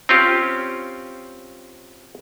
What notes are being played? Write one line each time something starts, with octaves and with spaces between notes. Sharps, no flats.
C4 C#4 F4 G4